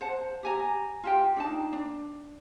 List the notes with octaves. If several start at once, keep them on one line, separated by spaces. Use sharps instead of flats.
C5 F#5 A5
G4 G#5 A#5
F4 G4 G5
D4 D#4 A5
D4